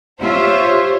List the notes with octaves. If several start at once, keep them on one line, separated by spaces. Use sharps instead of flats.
F4 G4 C5 C#5 E5